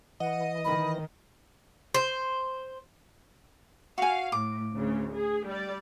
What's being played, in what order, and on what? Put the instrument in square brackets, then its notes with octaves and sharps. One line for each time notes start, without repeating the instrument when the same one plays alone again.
[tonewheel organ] E3 [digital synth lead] D#5 [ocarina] F#5
[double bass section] D#3 [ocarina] B5
[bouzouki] C5
[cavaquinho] F#4 G#5 [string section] F5
[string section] A2 [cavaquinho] D6
[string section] D2 C#3
G#4
G3 D5